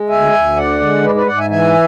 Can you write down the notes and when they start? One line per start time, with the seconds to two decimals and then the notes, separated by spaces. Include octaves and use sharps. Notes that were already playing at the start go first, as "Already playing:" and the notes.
Already playing: G#3
0.09 D2 E5 G#5
0.33 D2
0.56 D3 D5 F#5
0.80 G#3
1.03 G#2 B4 D5
1.15 B4 D5
1.27 G#2 D5 F#5
1.38 E5 G#5
1.50 E3 E5 G#5